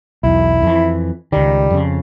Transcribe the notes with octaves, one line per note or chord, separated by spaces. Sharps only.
B1 E2 E4
F2 E3
C#2 D#3 G3
F2 C#3